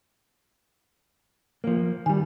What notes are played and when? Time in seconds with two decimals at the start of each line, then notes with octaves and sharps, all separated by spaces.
1.64 F3 A#3
2.06 D#3 G3 G#5